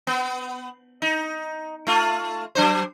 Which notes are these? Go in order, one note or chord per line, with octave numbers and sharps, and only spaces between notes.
B3
D#4
A3 F4
F#3 D4 C5